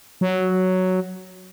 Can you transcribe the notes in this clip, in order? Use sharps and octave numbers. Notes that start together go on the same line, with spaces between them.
F#3